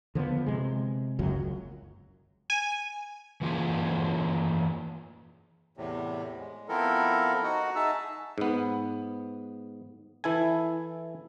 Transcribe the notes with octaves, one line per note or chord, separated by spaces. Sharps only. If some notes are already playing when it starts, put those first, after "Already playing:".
D3 F3 G#3 B3
C3 G#3
F#1 C#2 F#2 F#3
G#5
E3 A#3 F4 F#4 G#4
E2 A2 C3
G#3
F3 B3 C4 E4 A4 A#4
D#4 F#4 F#5
D#4 G#4 E5 A5 E6
G#2 B3
E3 E4 A4 G#5